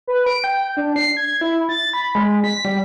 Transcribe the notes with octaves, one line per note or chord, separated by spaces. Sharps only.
B4
D7
G5
D4
C7
G#6
E4
A6
B5
G#3
B6
G3